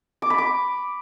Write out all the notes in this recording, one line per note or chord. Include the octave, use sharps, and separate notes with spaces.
D6
B5
D6